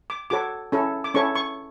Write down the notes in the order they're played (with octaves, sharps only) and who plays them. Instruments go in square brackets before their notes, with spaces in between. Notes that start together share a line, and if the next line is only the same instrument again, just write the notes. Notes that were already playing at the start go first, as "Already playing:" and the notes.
[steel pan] D6
F#4 A4 C#5 D6
C#4 E4 A4 C#5
D6
C#4 E4 A4 C#5 C#6
C#6